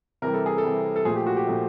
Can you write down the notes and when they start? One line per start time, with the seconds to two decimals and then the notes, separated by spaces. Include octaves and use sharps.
0.22 C3 E3 G3 A#4
0.34 A4
0.46 G#4
0.58 A4
0.64 C3 E3 G3
0.96 A4
1.05 A#2 F3 A3 G#4
1.16 G4
1.27 F#4
1.37 G4
1.47 A#2 F3 A3